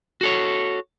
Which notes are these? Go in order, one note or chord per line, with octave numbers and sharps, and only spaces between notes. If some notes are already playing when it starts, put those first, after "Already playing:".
F#4 A4 C#5